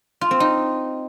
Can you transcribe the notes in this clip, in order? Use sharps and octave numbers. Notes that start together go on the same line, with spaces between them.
F4
C4
D#4